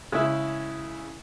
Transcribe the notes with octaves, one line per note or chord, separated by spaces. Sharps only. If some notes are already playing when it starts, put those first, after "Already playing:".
C#3 G#3 E4 E5